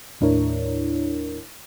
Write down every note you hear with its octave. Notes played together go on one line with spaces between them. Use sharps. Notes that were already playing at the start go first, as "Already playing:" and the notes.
D#2 A2 D4 E4 A#4 C#5